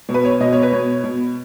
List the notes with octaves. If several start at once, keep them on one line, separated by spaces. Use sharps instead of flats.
B2
B4
C#5
B2 D#5
C#5
B4
B2 C#5
B2